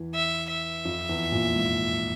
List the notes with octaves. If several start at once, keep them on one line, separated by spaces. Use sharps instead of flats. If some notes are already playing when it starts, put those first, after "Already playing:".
Already playing: E2 E3
E5
E5
F2 F3
E2 E3
A#1 A#2
G#2